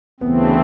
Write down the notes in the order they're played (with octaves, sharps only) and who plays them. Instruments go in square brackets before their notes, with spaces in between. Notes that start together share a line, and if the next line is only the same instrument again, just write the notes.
[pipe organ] D2 C#3 E3 A3 C4 [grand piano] B3